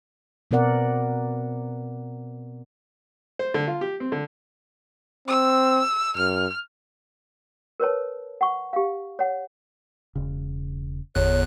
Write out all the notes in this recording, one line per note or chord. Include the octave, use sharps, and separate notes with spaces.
B2 B3 C4 A#4 D5 F#5
C5
D3
F4
G4
C4
D3
C4 E6
F#2 F6
A#4 B4 C#5 A5
F#5 C#6
G4 F5
C#5 F#5
E1 C#3
G1 E2 C#5 F#6